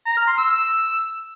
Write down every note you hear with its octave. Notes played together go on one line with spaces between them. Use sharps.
A#5
F6
C6
E6